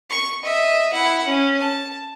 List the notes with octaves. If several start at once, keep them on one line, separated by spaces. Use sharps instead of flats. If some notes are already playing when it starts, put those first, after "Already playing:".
C#6
D#5 E5
E4 F#5
C#4
A5